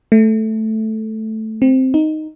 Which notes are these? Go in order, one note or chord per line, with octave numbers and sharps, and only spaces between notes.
A3
C4
D#4